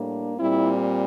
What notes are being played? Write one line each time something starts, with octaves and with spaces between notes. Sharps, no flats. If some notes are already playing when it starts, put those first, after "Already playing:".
Already playing: A2 G3 A#3 D4
A#2 G3 C4 E4